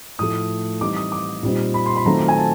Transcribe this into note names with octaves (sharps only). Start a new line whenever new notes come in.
A2 F3 A3 D#6
E3 G3 C4 D#4 D6
D#6
D6
A#2 G3 C4 D#4
B5
C6
B5
D#3 F#3 A3 C4 F4 A#5
G#5
A5